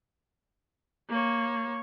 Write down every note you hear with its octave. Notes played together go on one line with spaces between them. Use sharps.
A#3 C#5